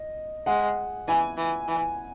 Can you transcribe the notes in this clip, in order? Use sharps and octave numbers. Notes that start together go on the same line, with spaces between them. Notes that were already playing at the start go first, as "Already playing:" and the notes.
Already playing: D#5
G#3 F#5
E3 G#5
E3
E3